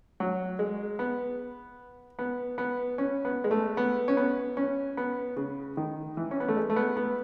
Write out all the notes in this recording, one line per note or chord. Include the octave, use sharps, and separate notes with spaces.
F#3
G#3
B3
B3
B3
C#4
B3
G#3
A3
B3
C#4
B3
C#4
B3
C#3
D#3
E3
C#4
B3
A3
G#3
A3
B3
B3